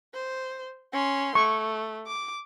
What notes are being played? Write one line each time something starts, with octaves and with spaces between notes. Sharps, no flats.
C5
C#4 C6
A3 C#6
D6